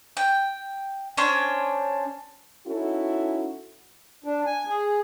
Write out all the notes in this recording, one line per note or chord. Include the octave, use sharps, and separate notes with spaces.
G5
C#4 D4 C5 C#5
C#4 D#4 E4 F#4 A4
D4
G#5
G#4